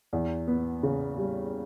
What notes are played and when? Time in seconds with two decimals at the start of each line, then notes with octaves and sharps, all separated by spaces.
0.13 E2
0.48 B3
0.83 C#3
1.18 G3